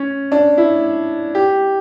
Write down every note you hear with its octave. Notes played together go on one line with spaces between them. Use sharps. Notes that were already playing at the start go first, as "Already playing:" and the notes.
Already playing: C#4
D4
E4
G4